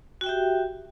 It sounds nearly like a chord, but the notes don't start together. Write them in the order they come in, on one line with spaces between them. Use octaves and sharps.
F#4 G5 E5 G4